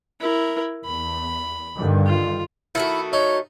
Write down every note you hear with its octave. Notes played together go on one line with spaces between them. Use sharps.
E4 A#4
E2 B5
G2 D3 D#3
F4
D#3 A3 E4 F#4
D#4 C#5